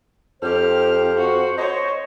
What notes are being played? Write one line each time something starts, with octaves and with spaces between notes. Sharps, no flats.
F2 G4 C5 F6
F#4
C5 C#5 D#5